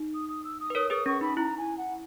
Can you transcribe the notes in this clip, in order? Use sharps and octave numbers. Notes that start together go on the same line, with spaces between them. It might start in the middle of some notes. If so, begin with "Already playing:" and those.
Already playing: D#4
D#6
D#6
E6
D#6
B4
A#4 C#5 D#6
G#4 B4 D#6
C#4 C#6
D#4 B5
E4 A#5
G#5
F#5